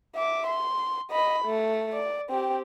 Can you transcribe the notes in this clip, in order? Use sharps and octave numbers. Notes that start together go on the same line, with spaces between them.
E5 D6
C6
D#5 B5
A3
D5
C4 G4